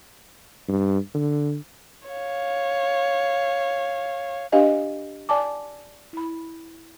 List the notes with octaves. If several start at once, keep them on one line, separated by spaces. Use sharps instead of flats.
G2
D3
C#5 F5
D4 G4 B4 D#5 F5 G#5
D5 G#5 A5 D6
E4 B5